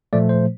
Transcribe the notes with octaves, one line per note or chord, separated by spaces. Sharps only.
A#2 F3 A3 D5
C5